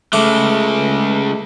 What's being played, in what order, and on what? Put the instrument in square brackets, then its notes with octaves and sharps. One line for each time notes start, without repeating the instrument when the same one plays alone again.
[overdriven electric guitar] C#3 G#3 [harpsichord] A3 D6